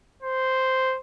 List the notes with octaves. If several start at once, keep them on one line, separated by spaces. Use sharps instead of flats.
C5